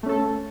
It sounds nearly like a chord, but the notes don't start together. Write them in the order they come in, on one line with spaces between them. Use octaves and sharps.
A3 C#4 A4